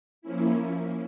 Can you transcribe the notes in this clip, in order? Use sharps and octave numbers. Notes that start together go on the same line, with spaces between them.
F3 A#3 C#4 E4